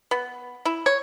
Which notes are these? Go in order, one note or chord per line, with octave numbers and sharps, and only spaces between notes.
B3
E4
C#5